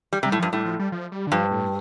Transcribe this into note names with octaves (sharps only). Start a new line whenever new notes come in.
G3
C3
G3
A2
G2 F3
A2 G3
F3
G3
F3
G3
D3
G2 F3
A2